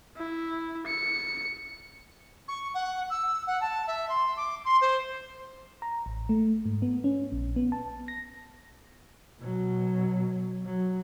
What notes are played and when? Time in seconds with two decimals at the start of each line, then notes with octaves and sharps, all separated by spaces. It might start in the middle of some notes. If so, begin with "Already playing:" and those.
0.17 E4
0.87 C#7
2.48 C#6
2.74 F#5
3.10 E6
3.47 F#5
3.60 A5
3.87 E5
4.08 C6
4.36 D6
4.64 C6
4.81 C5
5.82 A#5
6.06 A1
6.29 A3
6.66 G#2
6.82 B3
7.04 C#4
7.32 A#1
7.56 B3
7.72 A5
8.08 A#6
9.40 B2 F#3
10.66 F#3